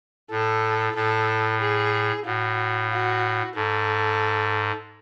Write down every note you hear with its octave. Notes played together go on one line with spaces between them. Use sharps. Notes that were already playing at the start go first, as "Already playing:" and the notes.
A2 A4
A2 A4
G#4
A2 F#4
F#4
G#2 A4